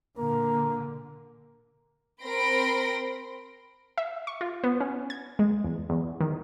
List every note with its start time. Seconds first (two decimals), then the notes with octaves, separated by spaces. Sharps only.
0.18 A#2 D3 A#3 A#4
2.23 C4 A#4 B5 C6 A#6 D7
3.98 E5
4.27 C#6
4.41 F4
4.64 B3
4.80 C#4
5.10 G#6
5.39 G#3
5.64 E2
5.90 E2
6.21 D#3